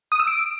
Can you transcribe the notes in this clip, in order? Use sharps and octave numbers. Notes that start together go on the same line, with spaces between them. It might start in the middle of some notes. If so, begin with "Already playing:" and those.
D#6
E6
D7